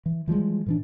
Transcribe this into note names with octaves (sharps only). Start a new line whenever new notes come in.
E3
E3 F3 G3 G#3
A2 E3 D4